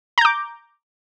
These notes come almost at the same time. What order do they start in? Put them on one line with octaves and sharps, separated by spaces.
A#5 G6 D6